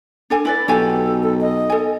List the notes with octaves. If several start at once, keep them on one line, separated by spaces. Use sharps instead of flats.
D4 A4 G#5
E4 B4 D5
B1 F#4 G4 A4 G#5
A4
D#5
A4 G#5